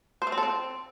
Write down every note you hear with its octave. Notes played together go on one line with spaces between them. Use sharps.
C5
A3
C4
A4
C4